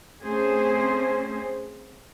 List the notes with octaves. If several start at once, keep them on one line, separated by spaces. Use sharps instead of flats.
A3 C4 C#4 G#4 C5